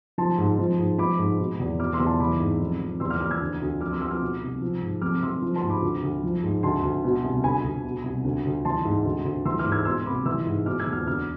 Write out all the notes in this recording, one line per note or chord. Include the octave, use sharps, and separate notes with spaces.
F3 A5 C6
G#2
F3
G#2
F3 B5 D6
G#2
B2
E2
B2 D6 F6
C6 E6
E2
A5 C6
E3 B5 D6
G#2
F2
F2
E2 C6 E6
D6 F6
E2 D6 F6
E6 G#6
D2
D2
F2 D6 F6
C6 E6
F2 C6 E6
D6 F6
B2
C2
F3
G#2
F2 D6 F6
F2 C6 E6
F3
A5 C6
G#2
B5 D6
D2
D2
F3
G#2
D2 A5 C6
D2
B2
C2
D2 G#5 B5
D2
B2
C2
D2
D2
E3 A5 C6
G#2
D2
D2
E3 C6 E6
D6 F6
G#2
E6 G#6
B2 C6 E6
C2 B5 D6
E3 C6 E6
G#2
B2 D6 F6
E6 G#6
E2
D6 F6
D2 D6 F6